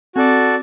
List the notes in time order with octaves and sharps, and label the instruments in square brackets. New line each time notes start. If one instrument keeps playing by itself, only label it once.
[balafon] C4 [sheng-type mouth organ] F#4 A4 D5